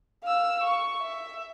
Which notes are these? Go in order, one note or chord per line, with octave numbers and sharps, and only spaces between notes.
F5 E6
C#6
E5